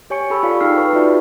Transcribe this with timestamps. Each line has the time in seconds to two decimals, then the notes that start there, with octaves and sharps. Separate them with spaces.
0.10 G4 C#5 G#5 C#6 C#7
0.30 G4 A4 A5 B5 C#6 E6
0.43 F4 D5 F5
0.61 D#4 G#4 G5 E6 F6 C7
0.77 B4 C#6
0.93 D#4 F4 F#4 G#4 D5 E5